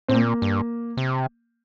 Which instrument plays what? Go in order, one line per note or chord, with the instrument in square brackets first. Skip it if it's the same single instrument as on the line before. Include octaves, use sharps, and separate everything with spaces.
[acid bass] A2 [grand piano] C4
[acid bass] A#2 [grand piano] A#3
[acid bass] G2
C3